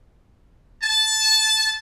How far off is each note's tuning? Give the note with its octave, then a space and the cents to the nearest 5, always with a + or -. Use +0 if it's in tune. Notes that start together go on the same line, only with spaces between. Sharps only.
A5 -10